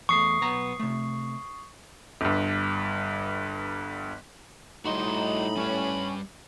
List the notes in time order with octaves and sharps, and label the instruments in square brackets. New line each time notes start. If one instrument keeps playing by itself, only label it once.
[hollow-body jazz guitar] E2 A3 [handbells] C#6 D#6 C7
[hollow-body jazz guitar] B1 B3 A#5
C3 A3
[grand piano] G1 G2
[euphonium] A2 [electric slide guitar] G3 F#4 [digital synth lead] D#4 [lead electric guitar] B5 C6
[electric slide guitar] G3 B4 [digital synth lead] C#4